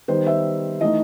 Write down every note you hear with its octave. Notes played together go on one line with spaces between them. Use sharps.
D#3 G3 B3 C5
E5
E3 A3 D#4 D#5